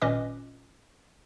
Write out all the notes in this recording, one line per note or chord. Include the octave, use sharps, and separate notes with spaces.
G#1 A#2 C#4 B4 D#5 D6